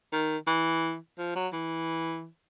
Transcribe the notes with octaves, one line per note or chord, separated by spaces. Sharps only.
D#3
E3
F3
F#3
E3